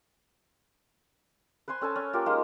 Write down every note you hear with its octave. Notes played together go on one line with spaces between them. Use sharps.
B4 C5 G#5 C6
C#4 A4 G#5 A5
C#4
A#3 F4 G4 A#4
G#3 A#3 D#4 F4